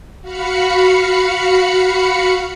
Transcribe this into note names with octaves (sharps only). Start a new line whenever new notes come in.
F#4 F5 B5 C#7